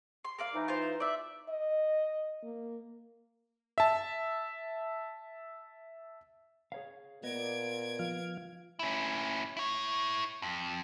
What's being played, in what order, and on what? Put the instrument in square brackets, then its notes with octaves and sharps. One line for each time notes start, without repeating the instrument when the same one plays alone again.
[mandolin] C6
A#3 D5 F5
[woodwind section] E3 D#4
[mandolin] F4 C5
D5 E5
[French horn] D#5
A#3
[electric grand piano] E5 A5
[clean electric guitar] G#4 C#5 F5
[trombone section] A#2 [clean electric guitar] B3 D#5 [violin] G#6 D7
[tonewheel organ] F3 F5
[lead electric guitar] C#4 E4
E4 C#5
F2